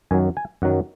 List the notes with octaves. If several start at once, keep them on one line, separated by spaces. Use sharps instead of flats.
F#2 D#3 F#3 G#5
G#5
F#2 D#3 F#3 F#5